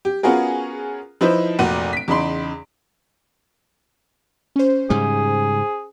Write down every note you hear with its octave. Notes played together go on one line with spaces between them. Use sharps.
G4
B3 C#4 F4 F#4 G#4 A#4
F3 D#4 E4 B4 C5
F1 A#2 F#4 F#5 D#7
B6 D7
E2 C#3 D#4 B5 C6
C#4 C5
G#2 C#3 G3 G#4